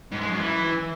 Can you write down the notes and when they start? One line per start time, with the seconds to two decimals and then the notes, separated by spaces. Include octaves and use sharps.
0.12 G#2
0.21 G#3
0.30 F#2
0.39 E3